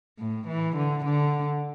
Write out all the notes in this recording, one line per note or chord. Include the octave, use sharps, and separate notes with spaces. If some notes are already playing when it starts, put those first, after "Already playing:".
A2
E3
D3
D3